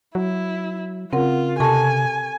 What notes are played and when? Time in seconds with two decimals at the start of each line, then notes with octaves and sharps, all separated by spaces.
0.15 F#3 E4
1.13 C#3 C4 F4 A#4 F#5
1.60 C3 A4 G#5 A5 C#6